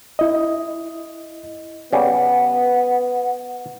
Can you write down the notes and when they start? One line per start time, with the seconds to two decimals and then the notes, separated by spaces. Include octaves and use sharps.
0.19 E4 D#5
1.93 C#3 G3 B3 F#5